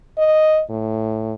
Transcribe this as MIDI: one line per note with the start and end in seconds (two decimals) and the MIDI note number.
0.18 0.62 75
0.70 1.34 45